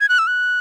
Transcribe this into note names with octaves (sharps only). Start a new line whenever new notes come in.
G#6
F#6
E6
F#6